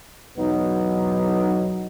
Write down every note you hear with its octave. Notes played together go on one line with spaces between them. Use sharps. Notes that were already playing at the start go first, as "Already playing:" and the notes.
B1 E2 F#3 B3 D#4